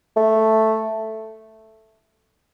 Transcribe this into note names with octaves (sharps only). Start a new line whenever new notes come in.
A3